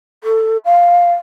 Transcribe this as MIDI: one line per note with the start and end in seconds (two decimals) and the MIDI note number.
0.24 0.57 69
0.65 1.14 77